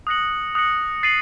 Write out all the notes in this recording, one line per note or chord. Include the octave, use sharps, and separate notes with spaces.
D#6 F#6 A#6 C#7 F#7
D#6 F#6 A#6 C#7 F#7
A6 C7 D#7 F#7